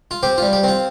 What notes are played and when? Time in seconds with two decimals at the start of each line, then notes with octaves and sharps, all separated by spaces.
0.11 F4
0.23 C4 G4
0.38 G3 F4
0.53 G4
0.63 C4 F4